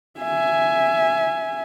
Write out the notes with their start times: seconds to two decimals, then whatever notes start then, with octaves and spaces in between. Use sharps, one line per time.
0.21 E5 G#5